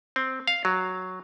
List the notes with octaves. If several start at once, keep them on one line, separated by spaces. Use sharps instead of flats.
C4
F5
F#3